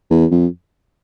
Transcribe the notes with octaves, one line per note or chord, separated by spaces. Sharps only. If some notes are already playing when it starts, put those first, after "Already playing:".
E2
F2